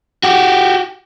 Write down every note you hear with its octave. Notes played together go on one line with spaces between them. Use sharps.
F#4 G4